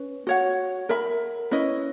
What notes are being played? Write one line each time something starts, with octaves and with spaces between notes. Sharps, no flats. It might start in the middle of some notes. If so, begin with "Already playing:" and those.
Already playing: C#4 B4
F#4 C#5 F#5
A#4 E5 B5
C#4 E4 B4 D#5